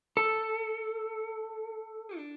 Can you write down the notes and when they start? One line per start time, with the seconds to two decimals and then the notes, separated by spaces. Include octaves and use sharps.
0.17 A4
2.17 D4